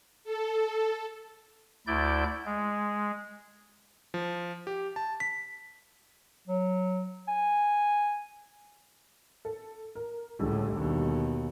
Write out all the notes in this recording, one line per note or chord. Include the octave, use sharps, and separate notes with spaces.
A4
D2 E4 D5 G6
G#3
F3
G4
A5
B6
F#3
G#5
A4
A#4
C#2 A2 D3 G3 G#3
D#2 B2